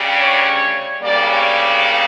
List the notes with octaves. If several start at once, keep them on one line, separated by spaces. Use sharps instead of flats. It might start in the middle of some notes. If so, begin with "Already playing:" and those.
Already playing: D2 C#3 G3
C#5
D2 C#3 G3 A#3 D5
C#5